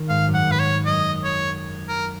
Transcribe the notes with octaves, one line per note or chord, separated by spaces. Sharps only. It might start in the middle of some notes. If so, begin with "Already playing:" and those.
Already playing: D#3
G#2 F5
F#2
F#5
G#2 B4
C#5
F#2 D#5
C#5
A#4